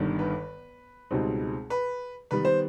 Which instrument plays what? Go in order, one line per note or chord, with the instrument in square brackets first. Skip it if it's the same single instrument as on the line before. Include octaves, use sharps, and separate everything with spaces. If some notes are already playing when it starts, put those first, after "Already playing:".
Already playing: [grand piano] G1 G2 D#3
[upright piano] B4
[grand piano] C#2 B2 G3 C4 D#4
[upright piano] B4
[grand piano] D#3 G3 B3 [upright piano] B4
[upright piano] C5